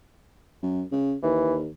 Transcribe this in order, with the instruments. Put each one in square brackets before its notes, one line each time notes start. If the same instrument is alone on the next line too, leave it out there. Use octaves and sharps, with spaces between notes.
[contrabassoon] F#2
C#3
[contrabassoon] D#2 [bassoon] E3